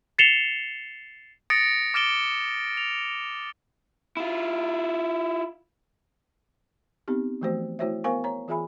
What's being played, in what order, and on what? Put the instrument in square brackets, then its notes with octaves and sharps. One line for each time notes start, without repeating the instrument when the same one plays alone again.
[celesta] A6 C7 C#7 E7 F7 G7
[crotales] D#6 A6 A#6 C#7 D7
D6 F6 A6 D7 E7 G7
F7
[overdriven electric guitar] E4 F4
[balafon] B3 C4 D#4 G4
E3 F3 A3 F#4 C5
A3 E4 F#4 C5 C#5 E5
B3 A#4 C5 F5 G#5 C#6
C#5 A#5
E3 F4 G#4 E5 G#5 B5